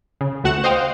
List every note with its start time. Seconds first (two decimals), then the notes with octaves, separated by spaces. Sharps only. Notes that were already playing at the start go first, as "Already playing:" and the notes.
0.21 C#3
0.44 D2 A3 F#4 F#5 C#7 E7
0.64 C5 D#5 F5 G5